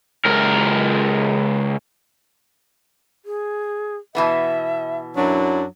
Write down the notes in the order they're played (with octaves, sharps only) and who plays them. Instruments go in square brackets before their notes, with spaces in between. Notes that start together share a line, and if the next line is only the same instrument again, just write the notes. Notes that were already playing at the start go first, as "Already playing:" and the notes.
[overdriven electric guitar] C#2 A#4
[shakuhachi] G#4
[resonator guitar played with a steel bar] B2 E3 B3 [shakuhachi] E5
[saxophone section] F#2 F#3 D4 [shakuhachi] E4